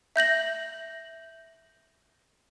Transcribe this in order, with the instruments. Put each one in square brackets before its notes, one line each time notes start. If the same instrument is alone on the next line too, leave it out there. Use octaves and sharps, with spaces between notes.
[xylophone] E5 G6 A#6 F#7